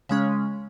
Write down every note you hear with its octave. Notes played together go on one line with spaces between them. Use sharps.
C#3 G#3 C#4